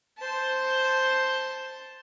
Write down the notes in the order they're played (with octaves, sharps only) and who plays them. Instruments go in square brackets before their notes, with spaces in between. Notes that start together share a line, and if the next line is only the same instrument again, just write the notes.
[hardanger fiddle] C5 A5